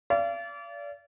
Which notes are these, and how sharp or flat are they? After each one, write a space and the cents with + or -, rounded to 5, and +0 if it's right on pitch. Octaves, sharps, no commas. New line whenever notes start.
D5 -30 F5 -40